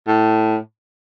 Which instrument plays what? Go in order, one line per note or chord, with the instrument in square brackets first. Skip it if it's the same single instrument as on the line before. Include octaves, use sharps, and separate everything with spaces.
[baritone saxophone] A2